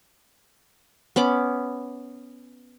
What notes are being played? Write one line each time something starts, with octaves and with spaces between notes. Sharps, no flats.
B3 C#4 B5 D6